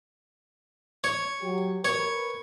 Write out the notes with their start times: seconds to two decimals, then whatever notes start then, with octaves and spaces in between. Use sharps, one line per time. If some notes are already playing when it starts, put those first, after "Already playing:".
1.04 C#5
1.41 F#3 G4
1.85 A#4 B4 C#5